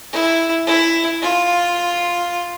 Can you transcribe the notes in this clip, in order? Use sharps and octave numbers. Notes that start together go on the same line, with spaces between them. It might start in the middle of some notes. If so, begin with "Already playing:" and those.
E4
E4
F4